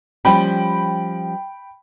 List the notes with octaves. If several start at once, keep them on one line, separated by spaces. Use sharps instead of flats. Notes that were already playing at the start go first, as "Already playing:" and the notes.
F3 G3 C#4 G5 B5